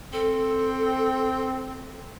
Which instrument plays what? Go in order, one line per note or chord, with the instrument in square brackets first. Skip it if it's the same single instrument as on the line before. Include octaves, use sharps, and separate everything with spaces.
[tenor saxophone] C4 [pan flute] A4